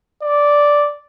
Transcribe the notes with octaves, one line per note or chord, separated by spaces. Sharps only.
D5